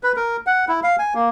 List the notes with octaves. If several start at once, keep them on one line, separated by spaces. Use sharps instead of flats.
B4
A#4
F#5
E4
F5
G#5
A#3